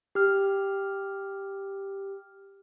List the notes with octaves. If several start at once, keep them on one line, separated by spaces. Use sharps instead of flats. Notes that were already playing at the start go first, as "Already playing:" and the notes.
G4 F6